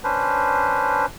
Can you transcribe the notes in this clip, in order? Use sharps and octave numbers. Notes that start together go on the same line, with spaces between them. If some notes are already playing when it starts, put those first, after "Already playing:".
C#4 D4 B4 C5